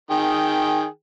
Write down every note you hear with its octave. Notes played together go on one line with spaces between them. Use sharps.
D#3 G#4 G5